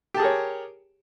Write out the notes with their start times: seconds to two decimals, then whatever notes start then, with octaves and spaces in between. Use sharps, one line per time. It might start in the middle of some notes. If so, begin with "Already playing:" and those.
0.14 G4
0.17 A5
0.19 G#4
0.22 A#4
0.25 C#5